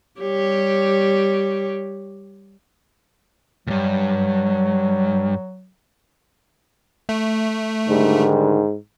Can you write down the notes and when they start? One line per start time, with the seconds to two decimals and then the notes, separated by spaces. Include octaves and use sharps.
0.20 G3 G4 C#5
3.67 D2 G2 F#3
7.09 A3
7.89 G#2 D3 D#3 G3